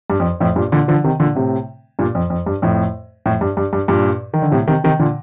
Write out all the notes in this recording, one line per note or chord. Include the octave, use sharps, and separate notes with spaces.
G2
F2
F2 A2
G2 A#2
A#2 D3
D3 F3
C3 D#3
A#2 D3
A2 C3
G2 A#2
F2
F2
G2
F2 A2
F2 A2
G2
G2
G2
G2 A#2
D#3
D3
A2 C3
C3 D#3
C3 D#3
A#2 D3